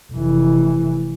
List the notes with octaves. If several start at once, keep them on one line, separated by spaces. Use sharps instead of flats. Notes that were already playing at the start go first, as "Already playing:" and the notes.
F1 E3